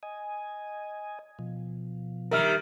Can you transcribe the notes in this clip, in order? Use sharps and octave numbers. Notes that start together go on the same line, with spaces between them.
D#5 G#5
B2 F3
D#3 G3 A#4 E5 F6